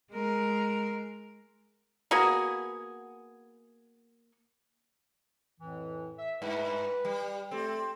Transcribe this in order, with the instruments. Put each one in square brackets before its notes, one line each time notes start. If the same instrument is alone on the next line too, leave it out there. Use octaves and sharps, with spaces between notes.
[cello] G#3 A#4
[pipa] A#3 B3 F#4 G#4
[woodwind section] F2 A2 E3
E5
[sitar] G2 [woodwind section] B4
[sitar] G3
[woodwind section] A3 G4 A4 [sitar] C4